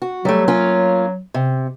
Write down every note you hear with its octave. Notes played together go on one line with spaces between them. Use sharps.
F#4
F#3 G3 A3
A#3 C#4 F4
C3